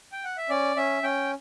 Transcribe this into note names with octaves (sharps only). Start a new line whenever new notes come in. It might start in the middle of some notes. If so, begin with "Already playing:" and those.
G5
F#5
E5
C#4 D5
C#4 E5
C#4 G5